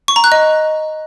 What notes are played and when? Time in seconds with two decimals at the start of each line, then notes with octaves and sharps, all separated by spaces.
0.08 C#6
0.16 A#5
0.24 F#6
0.32 D#5